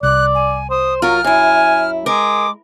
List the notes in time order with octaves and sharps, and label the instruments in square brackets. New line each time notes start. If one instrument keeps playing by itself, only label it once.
[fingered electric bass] C2 [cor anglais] D5 [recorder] F#6
[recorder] G#5
[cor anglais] C5 [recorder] D#6
[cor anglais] F#3 [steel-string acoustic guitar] F4 A#4 [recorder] F6
[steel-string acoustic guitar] F#2 E4 [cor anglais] G#5
[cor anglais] G#3 [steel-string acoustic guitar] A#4 [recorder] D6